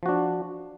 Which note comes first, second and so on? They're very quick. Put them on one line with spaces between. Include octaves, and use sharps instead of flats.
F3 F#4 D4